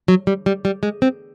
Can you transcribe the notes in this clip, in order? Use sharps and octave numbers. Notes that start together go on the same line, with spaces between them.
F#3
G3
G3
G3
G#3
C4